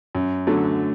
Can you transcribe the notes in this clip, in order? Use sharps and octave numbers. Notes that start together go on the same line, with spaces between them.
F#2
D3 F#3 A3